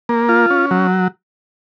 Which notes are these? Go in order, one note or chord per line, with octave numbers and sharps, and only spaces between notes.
A#3
F4
C#4
F#3